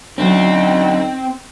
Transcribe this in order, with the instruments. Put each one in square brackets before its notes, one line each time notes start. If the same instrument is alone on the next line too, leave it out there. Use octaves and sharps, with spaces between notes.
[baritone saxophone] D2 [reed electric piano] F#3 C#4 [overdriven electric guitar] C4 [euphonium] D#4